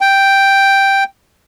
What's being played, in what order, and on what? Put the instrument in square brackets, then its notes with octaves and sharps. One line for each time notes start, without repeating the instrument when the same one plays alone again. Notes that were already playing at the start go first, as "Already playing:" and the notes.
[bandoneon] G5